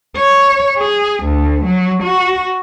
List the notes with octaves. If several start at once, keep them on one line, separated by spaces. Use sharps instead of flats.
C#5
G#4
D2
F#3
F#4